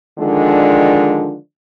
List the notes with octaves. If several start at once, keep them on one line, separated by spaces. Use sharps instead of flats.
D3 D#3 F3 G#3 D4